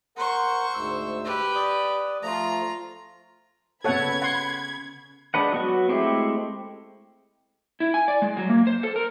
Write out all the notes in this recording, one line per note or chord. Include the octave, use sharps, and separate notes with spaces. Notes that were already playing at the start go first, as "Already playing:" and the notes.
A#4 C5 F#5 C#6
D2 G#2 E6
G4 B4
D5 D#6
F3 A3 F4 A#5
C#3 B3 A4 C#5 F#5 B5 G#6
F#5 C6
G#3 D4 B4 F#5
F#3 B3 F#4
G#3 A3 C4 E4 G4
E4
G#5
D5
G#3
F#3
A#3
C5
A4
A#4